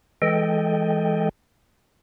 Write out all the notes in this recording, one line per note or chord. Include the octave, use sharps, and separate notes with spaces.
E3 G#3 A4 D#5 G5